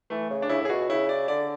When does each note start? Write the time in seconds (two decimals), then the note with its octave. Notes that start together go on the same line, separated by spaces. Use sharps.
0.10 E3 A3
0.30 C#3
0.42 D4
0.49 C#3 E4
0.61 A2
0.65 G#4
0.69 B2 F#4
0.89 C#3 E4
1.09 D5
1.28 D3 D5